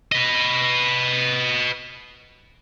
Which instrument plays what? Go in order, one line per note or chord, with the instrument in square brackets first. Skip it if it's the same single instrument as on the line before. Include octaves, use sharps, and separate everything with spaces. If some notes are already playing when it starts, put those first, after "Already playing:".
[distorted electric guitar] B4 D#5